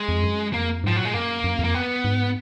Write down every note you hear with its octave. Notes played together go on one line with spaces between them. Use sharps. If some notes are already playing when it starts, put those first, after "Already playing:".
Already playing: G#3
F2
F#2
F2 A#3
G#2 F3
A#2 F#3
G#3
F#2 A#3
F#2
F2
A#3
B3
G#2